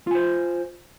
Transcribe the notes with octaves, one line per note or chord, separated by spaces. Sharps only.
F4 C5 G#5